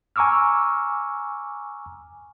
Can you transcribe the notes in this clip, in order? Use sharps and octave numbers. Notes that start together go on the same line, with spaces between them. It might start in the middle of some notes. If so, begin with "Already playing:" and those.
G#5 A#5 C#6 D6 E6 F6